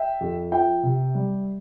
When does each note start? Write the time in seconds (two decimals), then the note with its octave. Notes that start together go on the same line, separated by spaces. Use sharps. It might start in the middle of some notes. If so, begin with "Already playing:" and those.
Already playing: E5 G5
0.21 F2
0.52 F3 E5 G5
0.83 C3
1.14 G3